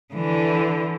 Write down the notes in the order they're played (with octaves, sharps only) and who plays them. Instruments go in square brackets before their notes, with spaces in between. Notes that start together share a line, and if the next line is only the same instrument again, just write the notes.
[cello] D3 E3